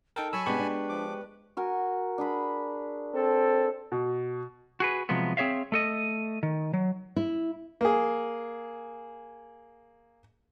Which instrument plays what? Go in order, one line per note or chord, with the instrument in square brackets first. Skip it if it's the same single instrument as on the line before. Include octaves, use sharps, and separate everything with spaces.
[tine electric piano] D#4 A4 A#4 [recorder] G5
[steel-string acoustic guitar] F#3 [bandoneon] G#5 A5 B5 [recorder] C#6 [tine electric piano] E6
[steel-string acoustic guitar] C3 B3 D4 [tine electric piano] G#3 G4 C#6 [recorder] B4
[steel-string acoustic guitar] D4
[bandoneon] F3 D6
[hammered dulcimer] F#4 A#4 G#5
D4 G#4 B5
[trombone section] C4 A4
[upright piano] B2
[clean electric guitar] F#4 G#4 B4
C3 F3 F#3 G#3 B3
C4 G#4 C#5 E5 F5
A3 A4 D#5
D#3
F#3
[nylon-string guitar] E4
[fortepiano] A#3 G#4